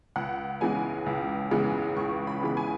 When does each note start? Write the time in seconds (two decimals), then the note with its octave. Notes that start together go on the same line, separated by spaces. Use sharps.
0.16 C#2 F#5
0.61 C#3 E3 G#3 B3 G#5
1.06 C#2
1.51 C#3 E3 G#3 B3
1.96 C#2 C#6
2.27 B5
2.42 C#3 E3 G#3 B3 B5
2.57 G#5